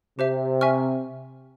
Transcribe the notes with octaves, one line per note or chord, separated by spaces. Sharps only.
C3 G4 C5 E5
E5 G#5 C#6 F6